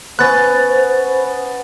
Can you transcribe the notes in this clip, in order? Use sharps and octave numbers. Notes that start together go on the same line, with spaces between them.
B3 C#4 C5 G#5 F#6 A6